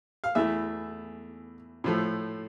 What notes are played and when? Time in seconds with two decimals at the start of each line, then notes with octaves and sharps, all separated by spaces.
0.24 F5
0.35 E2 E3 A3 E5
1.84 A2 F3 A3